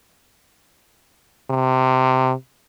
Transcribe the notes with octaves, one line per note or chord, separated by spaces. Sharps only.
C3